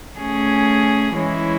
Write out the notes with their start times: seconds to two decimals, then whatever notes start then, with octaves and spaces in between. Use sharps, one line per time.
0.17 A3 C#4 G#4
1.14 E3 G#3 C#4 E4